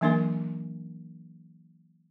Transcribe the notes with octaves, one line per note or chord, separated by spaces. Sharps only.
E3 F#3 A#3 D4 A#4 G#5